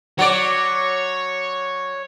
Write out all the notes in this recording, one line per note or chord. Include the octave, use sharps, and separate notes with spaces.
F#3 C#5 D5